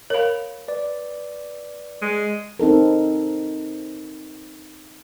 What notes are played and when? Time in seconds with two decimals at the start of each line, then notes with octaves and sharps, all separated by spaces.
0.10 A#4 C#5 F5 B5
0.68 B4 D5
2.02 G#3
2.60 C4 D#4 A4 A#4